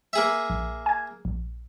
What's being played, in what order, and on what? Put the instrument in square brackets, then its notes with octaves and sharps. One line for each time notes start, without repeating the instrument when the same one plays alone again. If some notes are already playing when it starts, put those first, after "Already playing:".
[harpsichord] A#3 G#4 E5
[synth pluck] A#1
G#5 G#6
A#1